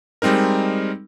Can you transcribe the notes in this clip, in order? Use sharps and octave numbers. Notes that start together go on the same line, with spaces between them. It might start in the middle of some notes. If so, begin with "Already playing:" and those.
G3 G#3 C4 D#4 A#4